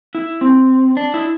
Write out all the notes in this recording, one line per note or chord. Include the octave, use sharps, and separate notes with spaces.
E4
C4
D4
E4